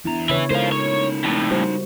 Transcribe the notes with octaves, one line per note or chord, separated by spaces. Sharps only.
E2 B3 D4 E4 A#5
C#3 E4 B4 C#5
G#3 D#4 F4 A4 A#4 C5 F5
C#5
F2 A2
G3 F#4 C5